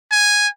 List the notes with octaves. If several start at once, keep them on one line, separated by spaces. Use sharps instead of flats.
G#5